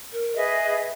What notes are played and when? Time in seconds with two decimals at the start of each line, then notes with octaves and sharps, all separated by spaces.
0.13 A#4
0.36 G#4 B4 D#5 E5